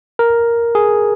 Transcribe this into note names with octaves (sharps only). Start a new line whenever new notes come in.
A#4
G#4